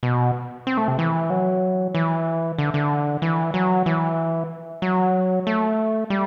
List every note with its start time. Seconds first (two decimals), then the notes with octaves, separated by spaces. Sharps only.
0.03 B2
0.67 C4
0.77 A3
0.88 C3
0.99 E3
1.30 F#3
1.95 E3
2.58 D3
2.74 D3
3.22 E3
3.54 F#3
3.86 E3
4.82 F#3
5.47 A3
6.10 G3